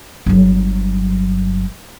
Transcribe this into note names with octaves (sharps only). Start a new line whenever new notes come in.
G1 F#3